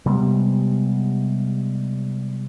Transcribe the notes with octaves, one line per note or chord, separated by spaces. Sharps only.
C3 G3 G#3 B3